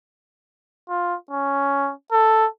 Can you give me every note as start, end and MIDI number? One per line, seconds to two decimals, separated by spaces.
0.89 1.15 65
1.31 1.92 61
2.12 2.46 69